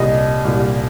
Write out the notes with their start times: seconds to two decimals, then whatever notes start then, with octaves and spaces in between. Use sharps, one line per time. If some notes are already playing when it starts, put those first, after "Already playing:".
Already playing: C2 A#2 G3 D#5
0.45 C2 A#2 G3